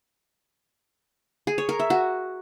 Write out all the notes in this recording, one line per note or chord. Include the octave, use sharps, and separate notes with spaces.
G#4
C#5
A#4
E5
F#4